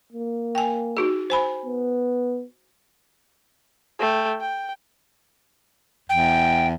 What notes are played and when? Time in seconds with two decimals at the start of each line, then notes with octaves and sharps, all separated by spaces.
0.12 A#3
0.55 G5 G#5
0.97 D#4 F#4 G#4
1.30 C5 G#5 B5
1.66 B3
4.00 A3 G5
4.40 G5
6.09 E2 G5